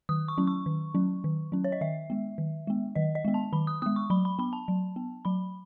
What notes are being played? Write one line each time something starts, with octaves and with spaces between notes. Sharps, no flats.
D#3 D#6
C#6
F#3 C#4
C#6
D#3
F#3 C#4
D#3
F#3 C#4
C#5
D#5
D#3 E5
G#3 B3
D#3
G#3 B3
D#3 D#5
D#5
G#3 B3
A5
D#3 B5
D#6
G#3 B3 D#6
C#6
F#3 B5
B5
B3 B5
A5
F#3
B3
F#3 B5